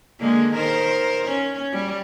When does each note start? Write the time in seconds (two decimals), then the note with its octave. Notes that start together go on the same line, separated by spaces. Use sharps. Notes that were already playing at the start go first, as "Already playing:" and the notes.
0.20 D3 G#3 A#3
0.53 D#3 A#4 C5
1.26 C#4 C#5
1.73 G3